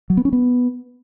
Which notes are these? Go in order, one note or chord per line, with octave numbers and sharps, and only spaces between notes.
F#3
B3
C#4
B3